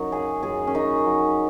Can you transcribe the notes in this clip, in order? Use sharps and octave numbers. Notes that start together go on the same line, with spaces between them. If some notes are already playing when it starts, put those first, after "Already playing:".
Already playing: F#2 F#3 D#4
C#3 G#4
F#2 G#4
C#4
F#2 D#4
F#3